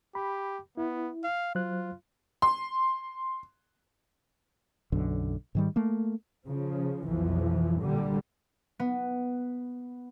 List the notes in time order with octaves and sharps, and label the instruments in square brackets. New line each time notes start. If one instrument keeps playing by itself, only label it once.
[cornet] G4 [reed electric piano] B5
[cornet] B3 [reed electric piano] E4
[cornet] F5
[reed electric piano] F#3 C5 F#6 [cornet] F4
[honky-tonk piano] C6
[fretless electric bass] B1 F#2 D3
G#2 D#3 G3
A3 A#3
[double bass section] C#3 F3
B1 F2 E3 F3
A#2 D3 G3
[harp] B3